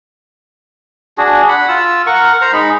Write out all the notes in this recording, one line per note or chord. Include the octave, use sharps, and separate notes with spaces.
D4 F#4 G#4
F#5 B5
F4 E6
A#4 F#5 C#6
C5 A#5
G#3 D#4 B5